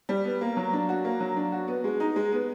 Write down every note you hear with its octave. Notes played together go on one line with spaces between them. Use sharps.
G3
B3
A#3
F#3
D4
F#4
A#3
F#3
D4
F#4
B3
G#3
D#4
G#3
B3